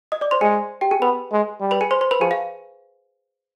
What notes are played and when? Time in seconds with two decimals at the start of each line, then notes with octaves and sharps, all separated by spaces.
0.12 D#5 D#6
0.21 D5 D6
0.31 C5 C6
0.41 G#3 G#4 G#5
0.81 G4 G5
0.91 G#4 G#5
1.01 B3 B4 B5
1.32 G#3
1.61 G3
1.71 B4 B5
1.81 G#4 G#5
1.91 C5 C6
2.01 C5 C6
2.11 B4 B5
2.20 F3 G#4 G#5
2.31 F5